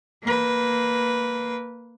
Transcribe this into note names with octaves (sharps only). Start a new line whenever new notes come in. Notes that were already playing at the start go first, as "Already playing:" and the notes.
A#3 B4